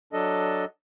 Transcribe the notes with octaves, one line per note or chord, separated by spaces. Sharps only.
F#3 D4 A4 D#5